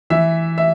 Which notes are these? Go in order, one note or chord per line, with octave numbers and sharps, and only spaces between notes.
E3 E5
E5